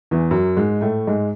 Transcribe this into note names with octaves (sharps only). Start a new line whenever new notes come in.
E2 E3
F#2 F#3
G#2 G#3
A2 A3
G#2 G#3